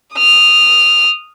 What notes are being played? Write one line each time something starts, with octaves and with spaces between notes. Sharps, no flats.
D#6 F6